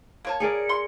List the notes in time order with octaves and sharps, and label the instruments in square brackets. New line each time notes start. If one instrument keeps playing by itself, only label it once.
[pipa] A#3 C#5 A5
[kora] G#4 A#4 D5 [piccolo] C#7
[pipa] C6